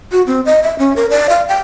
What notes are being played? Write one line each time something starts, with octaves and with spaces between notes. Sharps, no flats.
F#4
C4
D#5
E5
C#4
A#4
D5
F5
G5